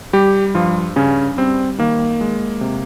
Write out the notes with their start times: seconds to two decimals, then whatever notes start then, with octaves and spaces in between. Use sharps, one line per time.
0.13 G3 G4
0.55 G2 F3 F4
0.96 G2 C#3 C#4
1.38 G3 C4
1.78 D#3 A#3
2.21 G#3
2.61 C3